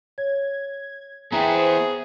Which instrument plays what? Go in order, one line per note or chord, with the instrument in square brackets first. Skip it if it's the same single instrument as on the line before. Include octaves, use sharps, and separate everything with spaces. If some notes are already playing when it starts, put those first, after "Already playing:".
[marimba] C#5 [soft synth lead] G#6
[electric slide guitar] B3 E4 [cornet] G#4 [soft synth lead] C5 [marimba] G5 A#5